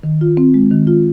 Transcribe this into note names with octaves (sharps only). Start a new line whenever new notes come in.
D#3
F4
C4
G#3
D#3
F4